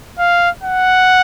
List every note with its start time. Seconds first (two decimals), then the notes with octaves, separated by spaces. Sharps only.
0.19 F5
0.63 F#5